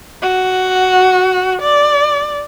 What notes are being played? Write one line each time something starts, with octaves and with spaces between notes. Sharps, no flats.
F#4
D5